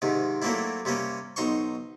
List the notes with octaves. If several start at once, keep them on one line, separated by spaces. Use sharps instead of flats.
G#2 C3 D#3
F#3 A3 A#3 C4 D4 E4
C3 G3 A#3 C#4
B1 D#4 C5 C6 C#6